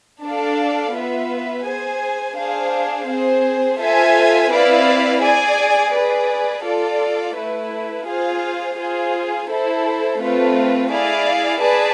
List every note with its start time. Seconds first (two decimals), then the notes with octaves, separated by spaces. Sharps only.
0.24 D4 A4 D5 F5
0.94 B3 F4 B4 E5
1.65 G#4 C5 G#5
2.36 D4 G#4 C5 F5
3.08 C4 G#4 C5
3.79 F4 A4 C5 E5 G#5
4.50 C4 E4 B4 D5 F5
5.22 G#4 D5 G#5
5.93 G#4 B4 D5
6.64 F4 A4 D5
7.36 A3 E4 B4
8.06 F4 G#4 C5 F5
8.77 F4 G#4 C5
9.48 E4 A4 C5
10.20 A3 C4 F4 B4
10.91 E4 G#4 D5 F5
11.62 G#4 B4 D5 A5